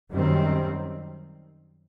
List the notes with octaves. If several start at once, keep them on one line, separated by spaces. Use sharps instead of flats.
F#2 D#3 G3 C4